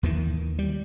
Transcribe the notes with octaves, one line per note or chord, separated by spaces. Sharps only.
D#2 D#3 E3
G3